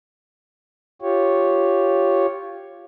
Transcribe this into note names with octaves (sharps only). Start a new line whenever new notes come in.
F4 G4 C#5